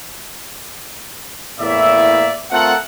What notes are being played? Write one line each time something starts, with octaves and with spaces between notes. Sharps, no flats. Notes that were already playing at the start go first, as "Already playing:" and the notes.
E2 A2 A#3 D5 E5
A3 C4 F4 A4 A#4 F#5